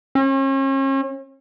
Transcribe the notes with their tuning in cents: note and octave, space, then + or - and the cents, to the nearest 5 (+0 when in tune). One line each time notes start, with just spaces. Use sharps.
C#4 -40